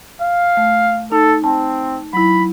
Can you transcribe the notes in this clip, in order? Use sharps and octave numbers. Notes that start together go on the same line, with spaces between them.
F5
A3
D#4 A4
C4 A5
F#3 E4 B5